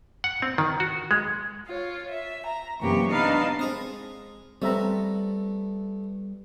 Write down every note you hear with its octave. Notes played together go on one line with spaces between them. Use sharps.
F#5
C4
D#3
F#4
G#3
F4 C#5
E5
A#5
F#2 C3 E3 A#3 G4 C#6
B3 D4 D#4 F5 A5 B5
G#3 C4 A#5 D#6
G3 A3 B3 C4 E5 A#5